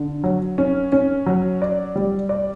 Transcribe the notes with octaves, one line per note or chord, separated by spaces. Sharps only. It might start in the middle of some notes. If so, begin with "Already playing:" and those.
Already playing: D3
F#3
C#4
C#4
F#3
D5
G3
D5